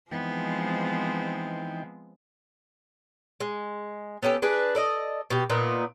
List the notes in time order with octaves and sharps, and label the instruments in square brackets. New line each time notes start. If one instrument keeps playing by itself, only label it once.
[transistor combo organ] E3 D#4 G5 [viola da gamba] F3 G#3 C4 [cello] B3
[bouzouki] G#3
B3 C#4 G4 A4
D4 G#4 B4 D5
A4 D5 D#5
B2 G4
A#2 B3 D#4